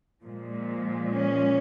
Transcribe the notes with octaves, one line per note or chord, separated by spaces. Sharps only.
A#2 F3 G#3
C#4